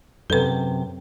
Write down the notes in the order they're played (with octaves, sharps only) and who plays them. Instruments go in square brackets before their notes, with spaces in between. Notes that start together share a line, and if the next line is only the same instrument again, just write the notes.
[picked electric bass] F#2 C3 [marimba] A4 B4